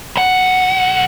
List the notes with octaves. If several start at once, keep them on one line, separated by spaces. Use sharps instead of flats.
B1 F#5